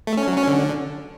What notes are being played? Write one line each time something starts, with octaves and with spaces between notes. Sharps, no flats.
A3
C#4
F#3
C#4
D3